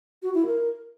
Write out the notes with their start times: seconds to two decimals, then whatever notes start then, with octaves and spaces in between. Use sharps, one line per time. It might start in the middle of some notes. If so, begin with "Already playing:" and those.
0.23 F#4
0.34 E4
0.46 A#4